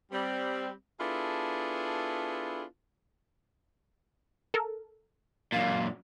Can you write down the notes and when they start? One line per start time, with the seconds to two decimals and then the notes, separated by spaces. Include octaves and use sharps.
0.12 G3 C4
1.00 B3 D4 E4 F4 G#4 A4
4.54 A4 A#4
5.52 F#2 A#2 F5